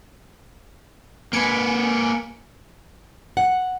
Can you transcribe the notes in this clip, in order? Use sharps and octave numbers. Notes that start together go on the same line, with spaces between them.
A#3 B4 G#5 C#7 D7
F#5